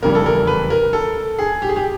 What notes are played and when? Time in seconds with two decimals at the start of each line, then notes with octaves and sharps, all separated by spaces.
0.02 F1 E2 C#3 E3 G3 A#4
0.15 A4
0.26 A#4
0.47 B4
0.70 A#4
0.93 A4
1.39 G#4
1.62 G4
1.69 G#4
1.76 G4